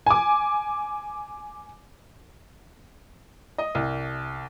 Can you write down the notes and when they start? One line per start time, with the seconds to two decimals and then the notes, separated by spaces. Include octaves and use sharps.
0.06 G#5 D6
3.58 D#5
3.75 C2